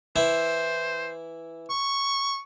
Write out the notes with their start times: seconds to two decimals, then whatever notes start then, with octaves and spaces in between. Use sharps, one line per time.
0.16 E3 E4 C5
1.70 C#6